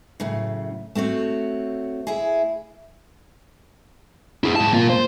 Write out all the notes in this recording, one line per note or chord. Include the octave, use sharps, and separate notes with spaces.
F#2 A2 C#3
A3 C4 F#4 C#5
E4 G#4
E4 G#4
G#2 A5
A#3 F4
C5